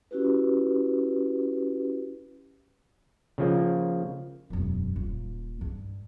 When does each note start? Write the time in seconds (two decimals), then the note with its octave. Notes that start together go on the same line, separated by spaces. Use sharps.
0.11 C#4 E4 F#4 G4 B4
3.38 C#3 F3 A#3
4.50 E1 F#2
4.96 D#1 A#3
5.61 G2